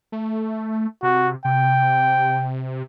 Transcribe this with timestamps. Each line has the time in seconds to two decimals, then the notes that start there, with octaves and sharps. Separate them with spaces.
0.12 A3
1.03 C3 F#4
1.45 C3 G5